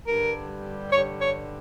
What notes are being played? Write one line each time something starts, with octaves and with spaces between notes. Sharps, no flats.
G2 D3 G3 A#4
G2 D3 G3 C#5
C#5